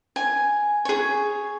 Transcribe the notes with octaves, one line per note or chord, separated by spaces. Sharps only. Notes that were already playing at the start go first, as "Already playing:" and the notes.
G#5
G#4 C#5